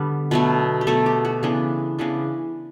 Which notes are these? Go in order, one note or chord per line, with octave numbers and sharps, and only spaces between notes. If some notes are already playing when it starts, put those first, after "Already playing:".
Already playing: D3 G3 B3 B4
B2 F#3 A3 B4
G4
B2 F#3 A3 A4
G4
F#4
C#3 E3 B3 D4
C#3 E3 B3 D4